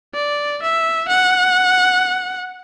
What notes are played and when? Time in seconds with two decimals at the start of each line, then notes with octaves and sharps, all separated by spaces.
0.14 D5
0.62 E5
1.09 F#5